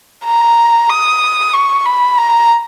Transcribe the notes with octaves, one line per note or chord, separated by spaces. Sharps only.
A#5
D#6
C#6
B5
A#5